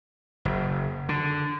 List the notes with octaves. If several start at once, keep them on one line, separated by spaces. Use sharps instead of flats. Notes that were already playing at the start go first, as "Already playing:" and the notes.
F#1
D3